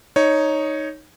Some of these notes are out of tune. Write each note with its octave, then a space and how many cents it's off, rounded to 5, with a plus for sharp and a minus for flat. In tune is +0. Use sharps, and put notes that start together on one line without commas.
D#4 +0 C#5 +0